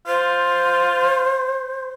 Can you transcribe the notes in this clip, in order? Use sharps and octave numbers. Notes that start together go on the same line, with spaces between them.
F4 C5